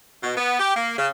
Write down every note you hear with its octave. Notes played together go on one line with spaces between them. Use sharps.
B2
B3
G4
A#3
C#3